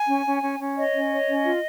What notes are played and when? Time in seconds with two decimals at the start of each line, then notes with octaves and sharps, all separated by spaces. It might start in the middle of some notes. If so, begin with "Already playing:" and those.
Already playing: G#5
0.09 C#4
0.26 C#4
0.42 C#4
0.60 C#4
0.76 C#5 D#5
0.94 C#4
1.11 C#5
1.28 C#4
1.45 F4